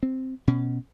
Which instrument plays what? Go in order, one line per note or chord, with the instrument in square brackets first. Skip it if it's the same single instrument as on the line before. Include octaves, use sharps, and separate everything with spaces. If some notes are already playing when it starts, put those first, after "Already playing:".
[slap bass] C4
B2 C#4